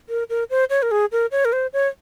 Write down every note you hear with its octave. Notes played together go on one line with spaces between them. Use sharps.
A#4
A#4
C5
C#5
A#4
G#4
A#4
C#5
A#4
C5
C#5